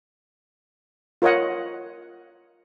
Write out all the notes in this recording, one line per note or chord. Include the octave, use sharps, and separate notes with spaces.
F4 A#4 C#5 D#5 F#5